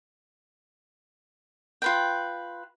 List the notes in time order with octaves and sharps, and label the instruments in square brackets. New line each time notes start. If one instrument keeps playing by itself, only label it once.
[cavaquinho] F4 B4 G5